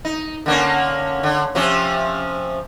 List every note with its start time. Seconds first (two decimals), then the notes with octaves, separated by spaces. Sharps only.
0.05 D#4
0.46 D3 A#3 C#4
1.23 D3
1.55 C3 F3 C#4